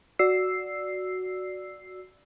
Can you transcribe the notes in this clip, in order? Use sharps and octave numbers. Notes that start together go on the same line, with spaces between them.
F#4 D5 E6 C7